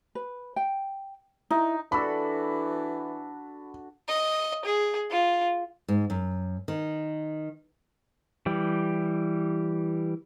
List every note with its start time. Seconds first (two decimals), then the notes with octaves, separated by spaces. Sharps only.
0.15 B4
0.56 G5
1.50 D#4 E4
1.92 E3 D4 F#4 A4 B5
4.08 D#5
4.65 G#4
5.11 F4
5.88 G#2
6.10 F#2
6.68 D#3
8.46 E3 G3 G4